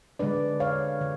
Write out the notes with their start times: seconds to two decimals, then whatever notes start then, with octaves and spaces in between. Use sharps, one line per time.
0.19 D3 G#3 D4 B4 D5
0.60 C#5 F5
1.01 D3